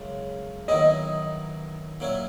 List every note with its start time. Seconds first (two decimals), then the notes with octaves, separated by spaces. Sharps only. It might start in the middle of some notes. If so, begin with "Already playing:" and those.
Already playing: F#2 C#3 G#3 C#4
0.68 D#3 F#3 B3 E4 D#5
2.00 A#2 F#3 C#4 E4